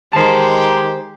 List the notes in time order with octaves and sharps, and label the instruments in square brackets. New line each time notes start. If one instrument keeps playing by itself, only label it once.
[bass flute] D#3 [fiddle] G#3 [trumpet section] G4 [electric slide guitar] C5 A5